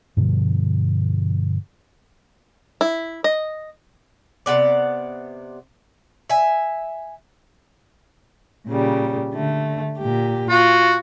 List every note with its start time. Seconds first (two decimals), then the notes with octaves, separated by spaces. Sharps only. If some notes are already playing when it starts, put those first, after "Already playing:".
0.17 G2 B2 D3 F3
2.81 E4
3.24 D#5
4.46 C3 B3 D5
6.30 E5 G#5
8.67 A#2 C#3 G3
9.33 D3 A3
9.98 A#2 G4
10.49 F4 F#4